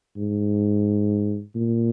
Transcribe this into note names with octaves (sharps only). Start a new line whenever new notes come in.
G#2
A#2